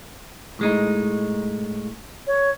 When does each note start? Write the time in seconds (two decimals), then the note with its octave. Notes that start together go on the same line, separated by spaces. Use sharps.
0.59 A2 G#3 D#4
2.27 C#5